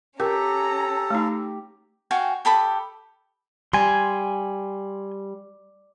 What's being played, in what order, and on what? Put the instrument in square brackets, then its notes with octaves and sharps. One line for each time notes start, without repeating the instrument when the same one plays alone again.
[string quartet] C#4 A#5 [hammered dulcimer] G4 [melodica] A4 [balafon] A#4
[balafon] A3 D#4
[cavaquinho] F#4 F5 G5 G#5
G4 A4 B5 D#6
[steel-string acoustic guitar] G3 [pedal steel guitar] G#5 C6